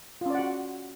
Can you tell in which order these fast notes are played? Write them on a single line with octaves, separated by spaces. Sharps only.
F4 C#4 D5 F#5 F#4